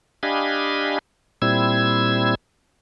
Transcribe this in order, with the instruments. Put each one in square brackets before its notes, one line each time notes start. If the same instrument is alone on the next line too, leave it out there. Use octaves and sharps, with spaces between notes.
[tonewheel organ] D4 G4 D#5 F5 G#5 B5
A#2 G3 C4 E4 E6 G#6